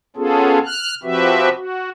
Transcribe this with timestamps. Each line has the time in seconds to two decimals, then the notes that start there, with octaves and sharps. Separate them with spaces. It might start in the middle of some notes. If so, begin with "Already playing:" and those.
0.16 B3 C#4 F4 G#4 A4
0.65 F6 F#6
1.03 F3 C4 F#4 G4 B4 E5
1.55 F#4